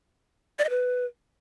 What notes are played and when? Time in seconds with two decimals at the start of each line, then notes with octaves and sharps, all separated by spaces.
0.59 D5
0.64 D#5
0.70 B4